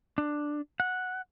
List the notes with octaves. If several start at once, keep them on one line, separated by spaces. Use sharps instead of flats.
D4
F#5